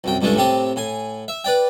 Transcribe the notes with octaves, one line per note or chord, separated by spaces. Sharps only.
C2 F#2 G5
C#2 G2 C#3 G#3 A3 D4
A2 C3 C4 G4 A5
A2 G#5
E5
B4 D5 G5